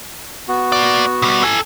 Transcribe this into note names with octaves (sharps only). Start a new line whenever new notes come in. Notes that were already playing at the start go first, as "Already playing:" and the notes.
B3 F#4
A#3 D5
B2 G3
A4 G#5